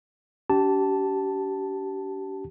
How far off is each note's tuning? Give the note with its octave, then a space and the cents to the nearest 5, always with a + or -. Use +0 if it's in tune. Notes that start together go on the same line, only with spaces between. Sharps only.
D4 -45 G4 -30 A5 +0